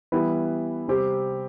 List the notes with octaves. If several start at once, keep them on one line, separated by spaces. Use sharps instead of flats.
E3 G3 B3 E4 B4
C3 G3 C4 G4 C5